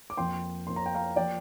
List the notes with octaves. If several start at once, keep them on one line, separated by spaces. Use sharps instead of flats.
D6
F2 F3 A#3 G5 C6
F2 F3 A#3 C6
A#5
G5
F5 A#5
F3 A#3 D5 G5